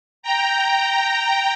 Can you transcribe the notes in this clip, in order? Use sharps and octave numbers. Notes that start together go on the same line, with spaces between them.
G5 A#5